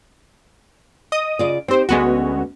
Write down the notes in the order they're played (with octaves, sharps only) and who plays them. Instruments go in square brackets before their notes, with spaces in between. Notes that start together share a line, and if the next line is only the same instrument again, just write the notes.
[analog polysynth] D#5 D#6
[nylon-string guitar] C#3 F4 D5
[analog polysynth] C4 C5 [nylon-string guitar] D#4 G4
[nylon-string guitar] D2 C#4 [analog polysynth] G#3 B3 F#4